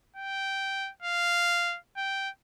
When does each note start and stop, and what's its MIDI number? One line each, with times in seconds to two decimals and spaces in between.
0.16 0.90 79
1.02 1.77 77
1.97 2.29 79